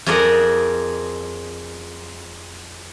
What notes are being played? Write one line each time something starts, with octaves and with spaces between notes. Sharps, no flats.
F2 G#4 A#4 D5 D#5 F#5